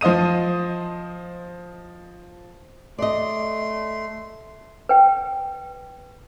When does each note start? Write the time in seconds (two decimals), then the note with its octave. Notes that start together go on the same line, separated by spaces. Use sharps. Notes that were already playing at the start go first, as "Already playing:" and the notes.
0.01 F3 C5 D#5 D#6 D#7
2.99 A3 D5 D#5 C6
4.89 B4 G5